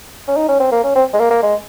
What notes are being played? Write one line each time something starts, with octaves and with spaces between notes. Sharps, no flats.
C#4
D#4
C#4
C4
A#3
C#4
C4
G#3
A#3
A#3
G#3